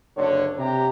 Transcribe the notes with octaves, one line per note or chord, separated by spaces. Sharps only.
F#1 D3 D4 C#5
C3 G4 A#5